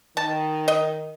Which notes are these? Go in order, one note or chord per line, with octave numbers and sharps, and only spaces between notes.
D#3 D#4 A5
D#5